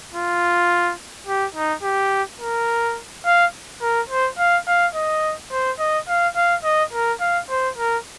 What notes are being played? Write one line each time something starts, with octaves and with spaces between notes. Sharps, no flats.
F4
G4
D#4
G4
A#4
F5
A#4
C5
F5
F5
D#5
C5
D#5
F5
F5
D#5
A#4
F5
C5
A#4